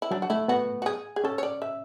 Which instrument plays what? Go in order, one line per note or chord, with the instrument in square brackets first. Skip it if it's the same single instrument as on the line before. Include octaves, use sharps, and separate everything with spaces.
[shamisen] E4
[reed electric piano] F#3 [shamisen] D4
[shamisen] F#4
[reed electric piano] A3 [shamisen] E4
[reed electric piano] B3 [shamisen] F#4
[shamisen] F#4
G#4
G#4
[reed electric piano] C#4 [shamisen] A4
[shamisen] C#5
D5
E5